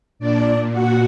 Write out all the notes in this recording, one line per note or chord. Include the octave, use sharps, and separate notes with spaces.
A#2 D4 D5
F#4 F#5